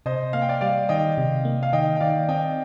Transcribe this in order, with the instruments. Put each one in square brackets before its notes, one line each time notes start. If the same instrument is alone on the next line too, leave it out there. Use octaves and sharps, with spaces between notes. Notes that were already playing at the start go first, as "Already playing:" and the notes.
[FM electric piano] C3 [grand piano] C5 D#5
[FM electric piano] A#3 [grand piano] F5
[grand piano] G5
D5 F5
[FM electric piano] G3 [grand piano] D5 F5
[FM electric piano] D#3 [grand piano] D#5 G5
[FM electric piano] C3
A#3
[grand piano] F5
[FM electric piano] D#3 [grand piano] D#5 G5
[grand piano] G5
[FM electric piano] D#3 [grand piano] D5 F5
[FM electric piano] C4 [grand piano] D#5 G5